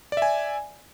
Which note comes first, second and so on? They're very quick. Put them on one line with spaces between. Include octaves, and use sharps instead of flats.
D5 E5 G#5